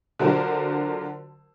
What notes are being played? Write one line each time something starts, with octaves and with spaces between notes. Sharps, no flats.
D3 F#3 F4 F#4 A#4 C5